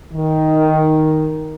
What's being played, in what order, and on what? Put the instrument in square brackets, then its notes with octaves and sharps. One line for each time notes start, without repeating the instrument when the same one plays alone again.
[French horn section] D#3